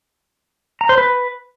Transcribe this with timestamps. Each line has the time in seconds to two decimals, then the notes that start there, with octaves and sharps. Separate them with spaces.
0.81 A#5
0.89 C5
0.98 B4